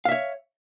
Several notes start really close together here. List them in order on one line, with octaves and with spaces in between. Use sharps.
F5 E5 C#5